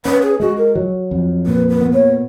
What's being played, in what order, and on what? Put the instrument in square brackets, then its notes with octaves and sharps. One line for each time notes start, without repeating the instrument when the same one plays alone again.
[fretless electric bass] C#4 [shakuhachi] B4
[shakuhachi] G#4
[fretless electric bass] G#3 [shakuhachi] F#4
[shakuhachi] A#4
[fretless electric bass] F#3
F2
[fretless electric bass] A#2 [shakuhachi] B4
[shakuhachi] B4
[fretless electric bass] B3
[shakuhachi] C#5